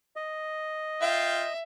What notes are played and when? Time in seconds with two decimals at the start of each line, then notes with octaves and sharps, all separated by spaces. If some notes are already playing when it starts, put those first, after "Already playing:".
0.16 D#5
1.01 F4 E5 F5 G5